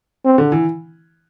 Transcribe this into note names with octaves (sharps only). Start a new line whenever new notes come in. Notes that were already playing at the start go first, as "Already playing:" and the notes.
C4
D3
E3